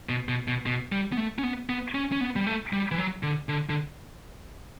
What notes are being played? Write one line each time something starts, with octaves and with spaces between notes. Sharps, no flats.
B2
B2
B2
B2
G3
B3
A3
C#4
B3
B3
C#4
C#4
B3
G3
A3
G3
E3
F#3
D3
D3
D3